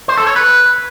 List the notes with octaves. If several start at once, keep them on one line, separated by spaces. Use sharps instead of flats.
C5
A4
C#5
B4